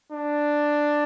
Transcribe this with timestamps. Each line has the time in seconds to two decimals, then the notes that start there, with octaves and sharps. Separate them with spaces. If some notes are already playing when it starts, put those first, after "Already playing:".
0.12 D4